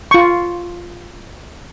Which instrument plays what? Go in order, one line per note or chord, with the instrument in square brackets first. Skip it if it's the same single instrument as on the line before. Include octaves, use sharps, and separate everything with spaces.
[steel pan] F4 C#6